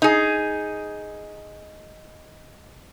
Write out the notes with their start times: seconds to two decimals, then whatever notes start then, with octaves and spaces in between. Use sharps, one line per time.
0.02 D#4 G#4